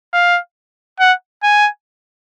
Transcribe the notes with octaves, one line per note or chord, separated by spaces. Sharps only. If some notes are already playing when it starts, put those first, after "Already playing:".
F5
F#5
G#5